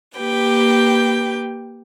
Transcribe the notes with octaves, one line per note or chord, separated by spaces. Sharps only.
A#3 G4 B4 G5